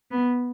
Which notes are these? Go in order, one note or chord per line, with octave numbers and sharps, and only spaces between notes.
B3